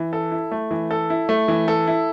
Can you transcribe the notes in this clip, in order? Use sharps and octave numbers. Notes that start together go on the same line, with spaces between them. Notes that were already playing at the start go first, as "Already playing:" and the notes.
Already playing: E3
A4
E4
A3
E3
A4
E4
A3
E3
A4
E4